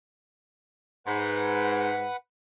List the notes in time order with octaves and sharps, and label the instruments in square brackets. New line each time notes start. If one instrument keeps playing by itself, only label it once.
[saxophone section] G#2 [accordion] B4 F#5